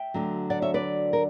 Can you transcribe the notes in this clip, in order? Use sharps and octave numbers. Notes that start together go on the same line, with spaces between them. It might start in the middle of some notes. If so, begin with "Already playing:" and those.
Already playing: E5 G5
D2 D3 F#3
D5 F#5
C#5 E5
B4 D5
A#4